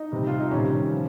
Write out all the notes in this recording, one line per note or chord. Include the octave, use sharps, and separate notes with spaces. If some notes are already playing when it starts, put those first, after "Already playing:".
Already playing: D#4
C3 G3
F4
D#4
C3 D#3 G3 C#4
F3